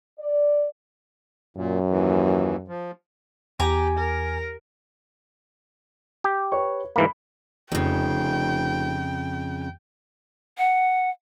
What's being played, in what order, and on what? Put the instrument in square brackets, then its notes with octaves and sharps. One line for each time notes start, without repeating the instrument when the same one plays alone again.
[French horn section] D5
[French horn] F#2 [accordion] A#2
[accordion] D#2 E3
F3
[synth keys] E2 [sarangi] G4 [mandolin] G#5 A#5 D6
[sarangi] A#4
[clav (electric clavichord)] G4
[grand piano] B4 C#5 C#6
[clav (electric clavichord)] G#2 E3 A#3 [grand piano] B5
[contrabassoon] F1 [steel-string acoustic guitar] F2 C#3 [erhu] G5
[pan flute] F#5